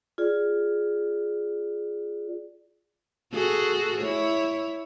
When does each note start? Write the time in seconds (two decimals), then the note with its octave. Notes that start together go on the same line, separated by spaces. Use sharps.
0.18 F4 G#4 D5
3.33 F#4 G#4 A4
4.01 E4 C#5